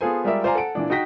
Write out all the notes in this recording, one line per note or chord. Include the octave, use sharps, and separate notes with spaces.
B3 F4 G#4 A4 C5 G#5
G3 G#3 F4 A#4 D5 E5
F4 C5 D5 F5 G#5 A#5
A4 F#5 D7
A#2 E3 D4
D#4 F#4 G5 A#6 B6